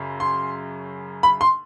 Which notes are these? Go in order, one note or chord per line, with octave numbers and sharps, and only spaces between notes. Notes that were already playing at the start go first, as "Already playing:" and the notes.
Already playing: F#2 C#3
C6
B5
C6